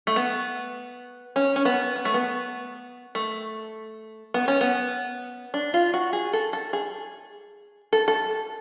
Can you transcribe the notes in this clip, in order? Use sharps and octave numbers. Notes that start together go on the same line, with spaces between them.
A3
B3
C#4
C#4
B3
B3
A3
B3
A3
B3
C#4
B3
D4
F4
F#4
G#4
A4
A4
G#4
A4
A4